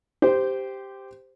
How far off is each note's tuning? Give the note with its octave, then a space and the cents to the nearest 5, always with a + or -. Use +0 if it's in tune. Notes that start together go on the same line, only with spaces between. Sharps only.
G4 +0 C5 -10